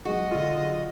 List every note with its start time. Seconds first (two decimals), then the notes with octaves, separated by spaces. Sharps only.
0.05 B1 G#3 F#4 D#5
0.31 D3 F4